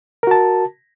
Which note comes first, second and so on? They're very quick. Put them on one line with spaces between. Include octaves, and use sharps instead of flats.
A#4 F#4 A5